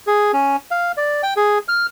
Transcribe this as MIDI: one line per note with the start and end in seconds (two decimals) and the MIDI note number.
0.07 0.32 68
0.33 0.56 61
0.71 0.92 77
0.97 1.22 74
1.23 1.34 79
1.37 1.58 68
1.68 1.86 89